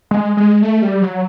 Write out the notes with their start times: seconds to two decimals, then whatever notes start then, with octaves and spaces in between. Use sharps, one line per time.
0.11 G#3
0.37 G#3
0.62 A3
0.82 G3
1.02 F#3